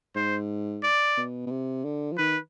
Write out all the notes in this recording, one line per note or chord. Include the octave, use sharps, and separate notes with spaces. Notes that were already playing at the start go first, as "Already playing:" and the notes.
G#2 C5
D5
B2
B2
C3
D3
F3
D#3 B4